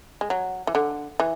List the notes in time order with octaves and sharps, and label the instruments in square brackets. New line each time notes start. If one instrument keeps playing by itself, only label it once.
[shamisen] G#3
F#3
E3
D3
E3